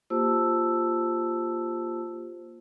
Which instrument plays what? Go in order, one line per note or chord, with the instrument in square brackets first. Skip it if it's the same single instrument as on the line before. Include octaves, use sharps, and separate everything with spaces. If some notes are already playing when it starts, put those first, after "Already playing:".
[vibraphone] A#3 F4 G4 C5 A5 E6